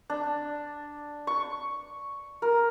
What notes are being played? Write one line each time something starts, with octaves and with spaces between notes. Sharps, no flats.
D4
C#6
A#4